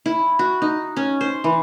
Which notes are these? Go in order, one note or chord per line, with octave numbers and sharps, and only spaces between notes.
E4
F#4
D#4
C#4
C5
E3